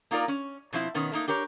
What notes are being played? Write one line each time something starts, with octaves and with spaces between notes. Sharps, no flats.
A#3 D#4 F4 A#4 D5
C#4
B2 F3 C4 E4
B2 D#3 B3 C#4
A3 A#3 D#4
D4 G4 A#4 C#5